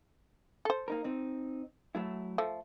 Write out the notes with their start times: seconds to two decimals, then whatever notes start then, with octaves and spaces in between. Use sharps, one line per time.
0.65 A4 C5
0.88 A#3 D#4 A#4
1.04 C4 D#4
1.95 F#3 A3 E4
2.38 F3 A3